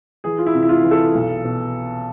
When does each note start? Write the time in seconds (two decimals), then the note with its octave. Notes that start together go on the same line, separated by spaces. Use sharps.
0.24 E3 G#4
0.39 F4
0.46 E4
0.55 C3
0.63 E4
0.69 F4
0.84 E3
0.91 A4
1.14 B1
1.44 B2